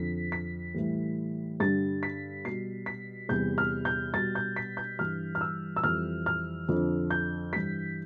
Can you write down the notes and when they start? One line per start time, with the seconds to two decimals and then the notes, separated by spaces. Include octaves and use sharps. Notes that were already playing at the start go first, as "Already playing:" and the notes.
Already playing: F2 D3 F3 B6
0.32 B6
0.74 A2 E3 G3
1.60 G2 D3 G3 A6
2.03 B6
2.45 B2 G3 C7
2.86 B6
3.29 E2 C3 G3 G6
3.58 F6
3.85 G6
4.14 B2 G3 A6
4.35 G6
4.56 B6
4.77 G6
4.99 G2 E3 G3 F6
5.35 F6
5.41 E6
5.76 E6
5.84 F2 E3 G3 F6
6.26 F6
6.68 F2 D3 F3
7.10 G6
7.53 G2 E3 G3 B6